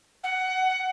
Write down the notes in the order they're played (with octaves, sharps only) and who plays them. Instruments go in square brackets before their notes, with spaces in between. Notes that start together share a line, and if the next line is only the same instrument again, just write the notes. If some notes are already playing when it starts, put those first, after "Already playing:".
[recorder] F#5